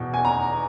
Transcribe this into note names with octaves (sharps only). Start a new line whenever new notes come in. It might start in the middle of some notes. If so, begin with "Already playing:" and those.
Already playing: E2 B2
G#5
A#5